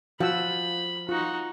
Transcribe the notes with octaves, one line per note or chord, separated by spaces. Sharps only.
F3 F#4 F#5 B5 E6
D#4 F4 F#4